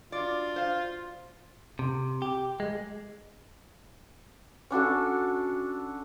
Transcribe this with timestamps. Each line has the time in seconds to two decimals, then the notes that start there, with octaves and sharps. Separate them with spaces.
0.12 D4 F4 F#4 D5
0.56 C5 F5
1.79 C3
2.22 G4
2.60 G#3
4.70 C#4 D4 F#4 A4